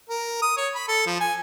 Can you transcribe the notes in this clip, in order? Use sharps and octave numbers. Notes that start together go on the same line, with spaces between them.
A#4
D#6
C#5
B5
A4
F3
G#5